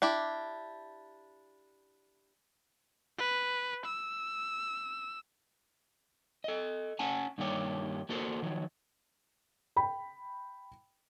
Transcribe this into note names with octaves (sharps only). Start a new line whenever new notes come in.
D4 E4 G4
B4
E6
A4 D#5
C#4 F#5 G#5 A5
G2 D#3 G3 A#3 G4 C#5
A#3 F#4 A4 A#4 C5
D#3 F3 F#3
G5 B5